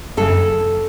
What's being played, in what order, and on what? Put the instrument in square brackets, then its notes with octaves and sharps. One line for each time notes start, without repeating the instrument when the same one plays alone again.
[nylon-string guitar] F#2 C#3 A4